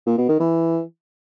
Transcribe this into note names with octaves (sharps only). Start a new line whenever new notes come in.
A#2
B2
D#3
E3